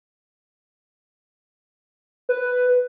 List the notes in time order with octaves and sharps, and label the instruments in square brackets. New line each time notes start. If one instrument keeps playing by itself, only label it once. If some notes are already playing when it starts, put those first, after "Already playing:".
[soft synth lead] B4